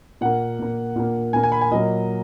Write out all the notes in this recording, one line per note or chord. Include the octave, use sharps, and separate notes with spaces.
A#2 A#3 F#5
A#2 A#3
A#2 A#3
A#2 A#3 G#5
G#5
B5
G#5
A#2 F#3 A#3 D#5